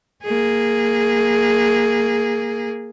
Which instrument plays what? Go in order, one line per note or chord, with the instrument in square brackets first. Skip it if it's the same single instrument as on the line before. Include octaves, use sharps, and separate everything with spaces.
[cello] A#3 G#4